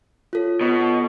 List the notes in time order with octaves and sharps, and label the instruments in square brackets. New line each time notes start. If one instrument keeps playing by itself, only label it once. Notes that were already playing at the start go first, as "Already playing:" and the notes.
[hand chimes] F4 A4 C#5
[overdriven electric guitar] B2